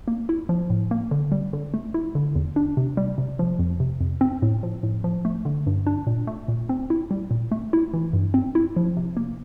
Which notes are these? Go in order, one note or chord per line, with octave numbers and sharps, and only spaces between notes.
A#3
E4
F3
A2
A#3
D3
G3
D3
A3
E4
D3
E2
D4
C3
G3
C3
F3
F2
C3
F2
C4
A2
F3
A2
F3
A3
D3
G2
D4
A#2
A3
A#2
C4
E4
G3
A#2
A3
E4
E3
G2
C4
E4
F3
C3
A#3